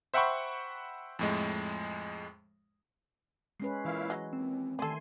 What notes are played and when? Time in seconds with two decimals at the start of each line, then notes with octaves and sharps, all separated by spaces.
0.14 C5 E5 F#5 G5 B5 C#6
1.19 F2 A2 G#3
3.60 G#3 C#4 B4 C7
3.85 A#2 E3 E4 B4 F5
4.10 F#3 G#3 D#5
4.33 D#2 C4
4.79 D#3 G3 A3 A4 G#5 C6